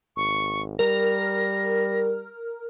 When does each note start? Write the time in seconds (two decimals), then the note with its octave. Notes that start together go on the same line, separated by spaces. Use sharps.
0.17 G#1 C#6
0.79 G3 A#4 A#6